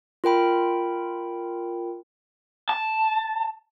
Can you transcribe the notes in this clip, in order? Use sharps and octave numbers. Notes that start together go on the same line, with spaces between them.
F4 A#4 G5 B5
A5